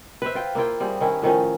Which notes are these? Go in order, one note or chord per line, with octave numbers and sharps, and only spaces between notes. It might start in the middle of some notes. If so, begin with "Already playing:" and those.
B4 C5 E5
F4 G5
A#3 E4 F4 G5
G3 C4 E4 G#4
D#3 C#4 E4
A2 D#3 F3 C#4